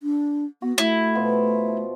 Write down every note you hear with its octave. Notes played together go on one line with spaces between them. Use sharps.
D4
B3 F#4
A3 E4
B2 F3 C6